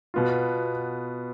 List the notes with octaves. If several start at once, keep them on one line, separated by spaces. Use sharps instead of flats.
B2 B3 F4